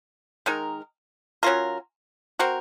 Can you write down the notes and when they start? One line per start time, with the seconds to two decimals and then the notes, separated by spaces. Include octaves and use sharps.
0.46 D#3 G#3 D#4 A#4
1.43 F#3 C#4 F4 A#4
2.39 C4 F#4 A#4